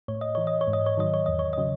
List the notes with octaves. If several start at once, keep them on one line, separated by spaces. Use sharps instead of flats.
A2 C#5
D#5
E3 C#5
D#5
C#5
G#2
D#5
C#5
D#3 F#3 D#5
C#5
E2 D#5
C#5
C#3 F#3 D#5